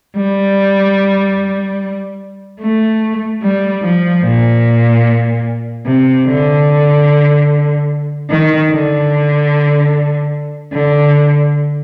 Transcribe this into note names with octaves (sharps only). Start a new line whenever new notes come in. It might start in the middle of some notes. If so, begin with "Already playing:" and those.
G3
A3
G3
F3
A#2
C3
D3
D#3
D3
D3